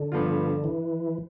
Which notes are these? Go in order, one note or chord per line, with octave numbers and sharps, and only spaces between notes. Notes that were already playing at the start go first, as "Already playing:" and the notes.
Already playing: D3
G2 F3 B3 F4
E3